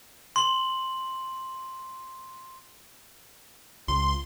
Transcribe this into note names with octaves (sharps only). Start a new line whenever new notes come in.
C6 F#7
C#2 C6